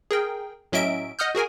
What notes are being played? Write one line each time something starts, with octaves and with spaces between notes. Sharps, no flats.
G#4 A#4 G5
A2 F#3 C#4 D#5 E5 D7
D#5 F#5 D#6 F6 G6
F#4 G#4 A#4 G#5